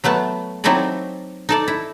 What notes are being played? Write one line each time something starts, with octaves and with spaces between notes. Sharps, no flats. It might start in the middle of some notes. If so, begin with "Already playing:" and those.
F#3 A3 B3 A5
F#3 C4 D#4 E4 A4 D5
D#4 A4 D5
E4